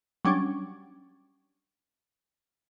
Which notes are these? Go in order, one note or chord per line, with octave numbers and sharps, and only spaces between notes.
F#3 G3 C#4 D4